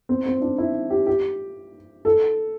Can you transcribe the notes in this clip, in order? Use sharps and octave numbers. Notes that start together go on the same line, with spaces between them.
C4
C4
D4
E4
G4
G4
A4